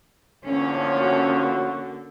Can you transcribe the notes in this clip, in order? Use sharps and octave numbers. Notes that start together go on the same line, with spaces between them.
E2 A2 D3 F3 A#3 C#4
F#4